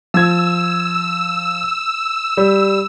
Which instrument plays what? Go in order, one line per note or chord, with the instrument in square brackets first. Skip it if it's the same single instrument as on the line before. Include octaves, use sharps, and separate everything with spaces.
[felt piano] F3 G#6 [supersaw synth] E6
[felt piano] G3